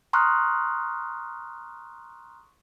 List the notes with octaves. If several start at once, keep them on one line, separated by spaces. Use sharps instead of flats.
A#5 C6 C#6 D#6 F6 F#6